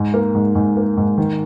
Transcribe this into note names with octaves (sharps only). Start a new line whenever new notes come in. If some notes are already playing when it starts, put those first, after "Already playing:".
Already playing: G#2
A#3
G#2
G#2
A#3
G#2
D#3